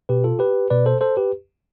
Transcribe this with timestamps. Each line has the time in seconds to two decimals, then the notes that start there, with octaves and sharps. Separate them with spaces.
0.09 B2 G4 B4
0.24 F4 A4
0.39 G4 B4
0.70 B2 B4 D5
0.86 A4 C5
1.01 A4 C5
1.17 G4 B4